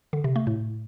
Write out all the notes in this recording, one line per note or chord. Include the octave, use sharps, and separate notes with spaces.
D3
C3
A3
A2